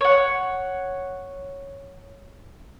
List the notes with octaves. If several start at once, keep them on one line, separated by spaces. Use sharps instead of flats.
C#5 F#5